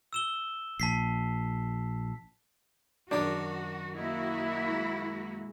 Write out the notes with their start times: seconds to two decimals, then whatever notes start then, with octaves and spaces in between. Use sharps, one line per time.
0.13 E6 E7 G7
0.80 A#1 A5 B6 C7
3.11 F#2 D#3 D4 F#4 C#5
3.96 A#3 E4 F#4 D#5
4.69 G#3